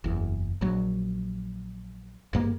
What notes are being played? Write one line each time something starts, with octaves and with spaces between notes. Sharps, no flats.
F#1 E2
A#1 F#3
G#1 G2 A#3